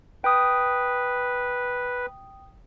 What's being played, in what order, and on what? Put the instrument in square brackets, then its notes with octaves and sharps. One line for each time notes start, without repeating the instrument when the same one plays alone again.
[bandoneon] B4 [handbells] G5 D#6